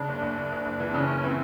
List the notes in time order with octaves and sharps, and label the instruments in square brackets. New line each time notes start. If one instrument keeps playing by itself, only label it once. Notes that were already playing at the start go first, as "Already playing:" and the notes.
Already playing: [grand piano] C#3 [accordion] D4
[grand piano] F#1
F#1
F#1
F#1
F#1
E3
[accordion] C4
[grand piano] C#3 [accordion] C#4
[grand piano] F#1
[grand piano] E3 [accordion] C4